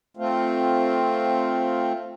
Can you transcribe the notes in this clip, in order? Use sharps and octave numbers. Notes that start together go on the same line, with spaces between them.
A3 C4 F4